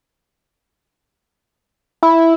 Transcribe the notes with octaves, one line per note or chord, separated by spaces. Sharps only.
E4